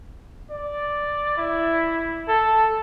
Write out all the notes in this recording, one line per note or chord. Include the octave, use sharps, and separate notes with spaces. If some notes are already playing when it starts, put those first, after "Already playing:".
D5
E4
A4